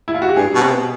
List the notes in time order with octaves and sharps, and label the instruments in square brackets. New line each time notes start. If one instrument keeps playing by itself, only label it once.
[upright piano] E4
F4
F#4
G4
[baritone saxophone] G2 [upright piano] G#4
[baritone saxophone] B2
C3
B2